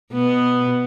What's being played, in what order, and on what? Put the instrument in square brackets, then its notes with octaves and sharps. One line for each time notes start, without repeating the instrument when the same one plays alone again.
[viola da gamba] B2 B3